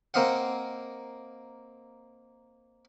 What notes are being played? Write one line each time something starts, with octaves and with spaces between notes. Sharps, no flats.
A#3 C4 D#5 F5 F#5